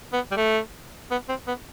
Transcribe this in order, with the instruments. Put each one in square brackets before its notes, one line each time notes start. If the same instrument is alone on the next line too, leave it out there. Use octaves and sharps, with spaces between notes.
[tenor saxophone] B3
G3
A3
B3
C4
B3